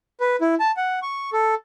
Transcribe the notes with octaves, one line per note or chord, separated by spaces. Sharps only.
B4
E4
A5
F#5
C#6
A4